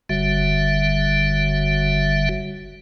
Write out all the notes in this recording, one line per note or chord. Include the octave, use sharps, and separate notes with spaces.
F#1 D3 G3 F#4 E5